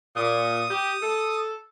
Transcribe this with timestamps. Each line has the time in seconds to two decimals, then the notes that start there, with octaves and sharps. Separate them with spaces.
0.16 A#2 D#6
0.70 G4
1.02 A4